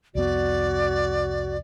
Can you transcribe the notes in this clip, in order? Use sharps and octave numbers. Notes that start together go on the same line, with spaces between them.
C2 F2 B3 F#4 D5